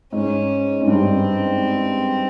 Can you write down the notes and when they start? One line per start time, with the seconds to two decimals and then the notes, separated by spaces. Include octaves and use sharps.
0.12 G#2 C#4
0.81 G#2
0.87 G2 C4